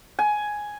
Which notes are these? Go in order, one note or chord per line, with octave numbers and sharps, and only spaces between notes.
G#5